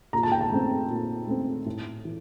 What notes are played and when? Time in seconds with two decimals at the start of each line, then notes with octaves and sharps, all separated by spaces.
0.13 A#2 A#5
0.23 A5
0.32 G5
0.41 A5
0.52 A3 C4
0.90 A#2
1.28 A3 C4
1.66 A2
2.05 E3